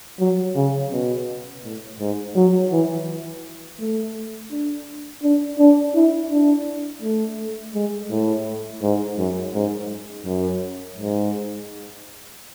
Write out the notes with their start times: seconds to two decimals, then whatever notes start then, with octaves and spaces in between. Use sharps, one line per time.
0.20 F#3
0.56 C#3
0.92 B2
1.64 A2
2.00 G#2
2.35 F#3
2.72 E3
3.80 A3
4.51 D4
5.23 D4
5.59 D4
5.95 E4
6.31 D4
7.02 A3
7.75 G#3
8.10 A2
8.82 G#2
9.18 F#2
9.54 G#2
10.26 F#2
10.98 G#2